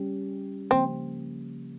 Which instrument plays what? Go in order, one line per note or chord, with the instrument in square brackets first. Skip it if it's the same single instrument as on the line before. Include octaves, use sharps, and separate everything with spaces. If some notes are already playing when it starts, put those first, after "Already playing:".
Already playing: [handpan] G3 C#4 G4
[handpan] C#3 F3 A#3 [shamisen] C4